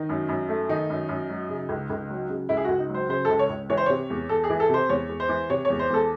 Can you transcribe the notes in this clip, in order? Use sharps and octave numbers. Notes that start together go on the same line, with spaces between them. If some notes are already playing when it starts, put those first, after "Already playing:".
Already playing: D#3 D#4
F#2
F#2
A3
D#3 D#4
F#2
F#2
F#3
C#3
C#2
C#2
F#3
C#3
C#2 E4
G#4
C#2 F#4
D#4
F#3
C5
C#3 C5
C#2 A4
C#5
C#2
E3 C#5
C5
C3 C#5
E2
E2 A4
G#4
E3
A4
C3 C5
E2 C#5
E2
C5
E3
C3 C#5
E2 C#5
C5
E2 A4